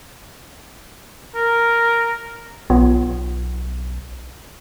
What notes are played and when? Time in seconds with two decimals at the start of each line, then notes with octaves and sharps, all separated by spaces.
1.35 A#4
2.70 B1 B3 F4 C#5